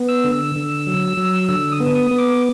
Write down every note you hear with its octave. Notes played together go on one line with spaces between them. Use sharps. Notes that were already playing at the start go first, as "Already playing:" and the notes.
Already playing: B3
E6
D3
E6
D3
F#3
F#3
D3 E6
D#6
B3
D#6
B3
D6